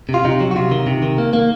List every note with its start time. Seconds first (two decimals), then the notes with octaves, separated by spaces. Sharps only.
0.09 C3
0.14 F4
0.25 C3 D#4
0.40 F#3
0.51 F#4
0.56 C3 F4
0.71 D#3
0.87 C3
1.02 D#3
1.18 A#3
1.33 A#3